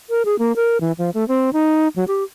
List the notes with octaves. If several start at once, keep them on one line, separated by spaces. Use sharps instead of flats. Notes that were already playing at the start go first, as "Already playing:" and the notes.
A#4
G#4
A#3
A#4
E3
F3
A3
C4
D#4
F#3
G4